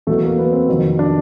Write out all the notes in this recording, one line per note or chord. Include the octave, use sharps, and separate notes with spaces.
E2 B2 F#3 A3
A#3
B3
C4
F2 C3 D#3 F#3
D4